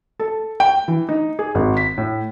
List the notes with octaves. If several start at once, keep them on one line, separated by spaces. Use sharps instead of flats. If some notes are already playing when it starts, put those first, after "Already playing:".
A4
G5
E3
D#4
G#4
G#1
B6
A2